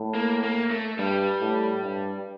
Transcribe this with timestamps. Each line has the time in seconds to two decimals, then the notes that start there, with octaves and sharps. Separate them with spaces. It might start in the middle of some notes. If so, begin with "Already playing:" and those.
Already playing: A2
0.14 A#3
0.43 A#3
0.71 A3
0.98 G2 G3
1.41 A2
1.83 G2